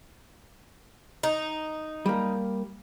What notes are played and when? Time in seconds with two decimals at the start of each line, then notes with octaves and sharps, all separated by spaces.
1.23 D#4
2.06 G3 A#3